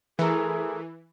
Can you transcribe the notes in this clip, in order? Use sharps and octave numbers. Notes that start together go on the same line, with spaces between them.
E3 A3 G#4 A#4